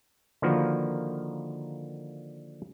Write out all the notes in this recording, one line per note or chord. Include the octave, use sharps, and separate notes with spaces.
D3 D#3 F3 A#3 F#4 B4